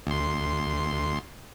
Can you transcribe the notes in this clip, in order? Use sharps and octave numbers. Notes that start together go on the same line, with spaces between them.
D2 C6